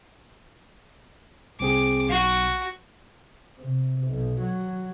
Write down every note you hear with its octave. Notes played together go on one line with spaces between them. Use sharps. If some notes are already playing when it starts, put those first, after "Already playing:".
C2 C4 G#4 D6
B1 F#4
C3
B1
F#3